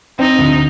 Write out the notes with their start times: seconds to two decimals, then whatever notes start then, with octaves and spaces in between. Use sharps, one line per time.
0.19 C4 D#4
0.39 D2